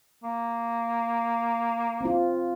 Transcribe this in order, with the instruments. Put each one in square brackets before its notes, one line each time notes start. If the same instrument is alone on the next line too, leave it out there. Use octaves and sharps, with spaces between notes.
[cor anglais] A#3
[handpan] C4 F4